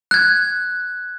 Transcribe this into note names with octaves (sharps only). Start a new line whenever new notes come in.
F#6 G#6